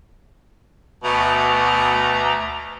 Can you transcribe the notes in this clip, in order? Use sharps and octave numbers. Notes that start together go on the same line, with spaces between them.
D2 B2 A3 A#5